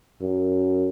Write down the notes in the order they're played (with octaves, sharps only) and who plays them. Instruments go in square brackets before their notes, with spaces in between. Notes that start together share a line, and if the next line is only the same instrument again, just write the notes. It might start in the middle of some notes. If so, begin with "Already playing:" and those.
[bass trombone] F#2